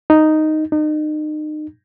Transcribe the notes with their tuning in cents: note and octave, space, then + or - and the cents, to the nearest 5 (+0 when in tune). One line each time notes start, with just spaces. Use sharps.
D#4 +0
D#4 -30